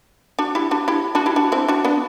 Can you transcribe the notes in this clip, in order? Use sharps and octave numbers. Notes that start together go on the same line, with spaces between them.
D4 F#4
E4 G4
D4 F#4
E4 G4
D4 F#4
E4 G4
D4 F#4
C4 E4
D4 F#4
B3 D4